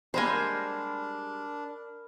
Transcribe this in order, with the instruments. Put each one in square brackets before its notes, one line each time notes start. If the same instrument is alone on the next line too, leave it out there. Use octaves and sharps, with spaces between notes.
[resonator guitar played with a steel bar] G3 G#3 A#3 [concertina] D4 [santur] A#4 B5 [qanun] C5 G#5